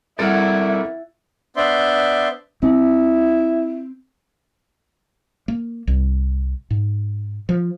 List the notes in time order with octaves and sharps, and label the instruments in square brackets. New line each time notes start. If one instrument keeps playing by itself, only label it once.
[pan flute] G3 [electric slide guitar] C4 A4 A#4 [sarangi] E4 [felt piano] F#5 F6 A6
[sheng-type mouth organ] B3 D4 C5 D5 E5 C6
[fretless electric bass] C4 [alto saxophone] E4
[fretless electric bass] A#3
C2
G#2
F3